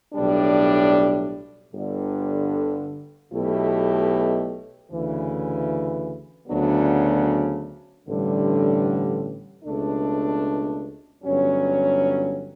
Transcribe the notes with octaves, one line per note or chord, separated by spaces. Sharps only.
B1 A2 G3 D4
G1 G2 D3
B1 B2 A3 E4 G4
D2 C#3 E3
D2 C#3 F#3 B3 D4
A1 G2 D3 G3
C#2 B2 A3 D4
G1 G2 F#3 C#4